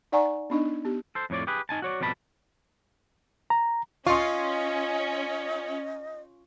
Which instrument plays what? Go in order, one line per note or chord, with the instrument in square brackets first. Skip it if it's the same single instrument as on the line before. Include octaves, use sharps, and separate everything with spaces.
[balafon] D#4 D5 F#5 G#5 A#5 C#6
B3 D4 D#4 D#5
B3 G4
[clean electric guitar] A4 C5
F2 A2 C#5 D5
G4 G#4 B4
D#4 G#5 A5
F#4 C#5 D5
F2 B2 G3 A5 B5
[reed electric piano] A#5
[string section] C#4 [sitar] F4 [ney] D#5 [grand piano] C6 C#6